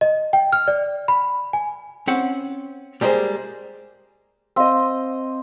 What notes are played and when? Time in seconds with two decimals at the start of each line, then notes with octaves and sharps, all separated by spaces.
0.01 D#5
0.33 G5
0.52 F6
0.68 D5
1.08 B5
1.53 G#5
2.07 C4 C#4 F#5
3.01 G3 G#3 A#3 G#4 C5
4.56 C4 D#5 F5 C6 E6